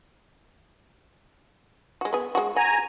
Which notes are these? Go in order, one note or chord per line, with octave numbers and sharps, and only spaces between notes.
G#3 F#4
B3 G#4
G#3 F#4
F#5 G#5 A#5